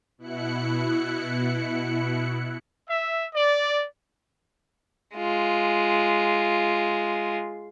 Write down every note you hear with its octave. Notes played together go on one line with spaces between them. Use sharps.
B2 E4 F#6 C#7
E5
D5
G#3 F4